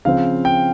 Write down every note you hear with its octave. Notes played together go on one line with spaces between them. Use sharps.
C#3 F3 C4 F5
G5